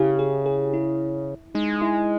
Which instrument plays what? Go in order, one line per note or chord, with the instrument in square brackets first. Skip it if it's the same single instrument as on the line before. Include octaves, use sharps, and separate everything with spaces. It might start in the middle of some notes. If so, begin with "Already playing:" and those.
Already playing: [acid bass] C#3 [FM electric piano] E4 G4
[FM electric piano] G#4
G#4
E4
[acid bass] G#3 [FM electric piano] D#4
[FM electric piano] E4